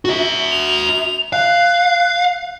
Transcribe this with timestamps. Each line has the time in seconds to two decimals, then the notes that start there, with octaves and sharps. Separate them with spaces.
0.05 F#4 E5
0.51 F7
1.33 F5 F#6